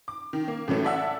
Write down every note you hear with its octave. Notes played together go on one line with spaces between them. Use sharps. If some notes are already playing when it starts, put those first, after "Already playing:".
D6
D#3
A#3
A2 E3 F#3 A3
A4 D5 E5 F#5 E6